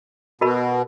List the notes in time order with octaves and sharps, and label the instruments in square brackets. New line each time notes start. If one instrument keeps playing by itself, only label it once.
[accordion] B2 [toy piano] F#4 A#4 B5